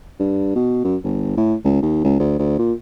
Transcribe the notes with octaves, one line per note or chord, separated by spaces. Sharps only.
G2
B2
F#2
G1
A2
C#2
D#2
C#2
D2
D2
A#2